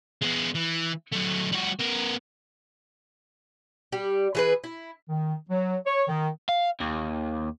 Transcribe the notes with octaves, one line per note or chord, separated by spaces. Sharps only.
G#3 B3
E3
F#3 A3
G3 F#4
B3 A#4
G3 G4
E3 G#4 B4
E4
D#3
F#3
C#5
D#3
F5
D#2